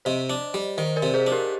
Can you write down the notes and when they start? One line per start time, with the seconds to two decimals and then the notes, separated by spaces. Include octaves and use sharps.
0.05 C3 C5 D#5
0.30 D4
0.54 G3
0.78 D#3 C5 D#5
0.96 A#4 D5
1.02 C3
1.14 G#4 C5
1.27 D4 C5
1.32 G4 A#4